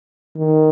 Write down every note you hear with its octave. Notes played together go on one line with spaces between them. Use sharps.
D#3